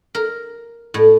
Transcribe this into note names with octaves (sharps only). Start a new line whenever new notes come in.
A#4
A2